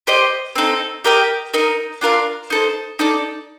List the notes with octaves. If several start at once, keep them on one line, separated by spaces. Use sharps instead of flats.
G4 C5 D#5
C4 D#4 A4
G4 A#4 D#5 G5
D#4 A#4 D#5
D4 F4 A#4 F5
D#4 A4 C5
D#4 A4 D5